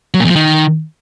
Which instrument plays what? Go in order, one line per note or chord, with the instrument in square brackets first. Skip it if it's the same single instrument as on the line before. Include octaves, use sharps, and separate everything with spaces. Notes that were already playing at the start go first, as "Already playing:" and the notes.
[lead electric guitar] F#3
A#2
E2
F3
D#3